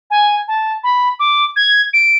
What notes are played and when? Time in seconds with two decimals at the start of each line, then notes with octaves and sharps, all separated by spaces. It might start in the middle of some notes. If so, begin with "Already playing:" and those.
0.11 G#5
0.48 A5
0.84 B5
1.20 D6
1.56 G#6
1.93 D7